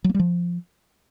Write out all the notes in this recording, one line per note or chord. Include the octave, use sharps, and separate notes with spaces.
F#3
A#3
G3
F3